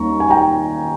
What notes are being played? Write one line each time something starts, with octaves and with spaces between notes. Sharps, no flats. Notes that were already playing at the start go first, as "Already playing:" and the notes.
Already playing: D#2 D#3 G3 A#3 C#4 A#5 C#6
G#5
G5 A#5